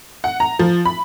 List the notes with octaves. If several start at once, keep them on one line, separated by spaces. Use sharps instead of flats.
F#5
A#5
F3
B5